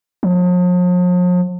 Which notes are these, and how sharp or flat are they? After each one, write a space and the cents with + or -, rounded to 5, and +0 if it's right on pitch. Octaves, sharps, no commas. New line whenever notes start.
F3 +45